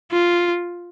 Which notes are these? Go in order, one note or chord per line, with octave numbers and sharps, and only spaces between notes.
F4